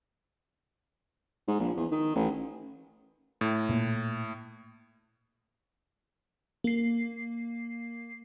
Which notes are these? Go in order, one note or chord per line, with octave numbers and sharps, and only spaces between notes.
G#2
A#1
E2
D#3
A1
A2
A#2 A#3
A#3 C7